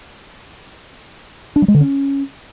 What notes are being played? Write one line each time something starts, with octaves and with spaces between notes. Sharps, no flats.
D4
G3
G#3
D3
C#4